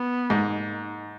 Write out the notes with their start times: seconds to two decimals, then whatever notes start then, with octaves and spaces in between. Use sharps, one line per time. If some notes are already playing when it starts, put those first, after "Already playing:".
Already playing: B3
0.30 G#2 A#3